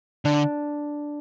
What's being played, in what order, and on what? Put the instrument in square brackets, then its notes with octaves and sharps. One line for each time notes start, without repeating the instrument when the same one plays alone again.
[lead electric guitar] D3 [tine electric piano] D4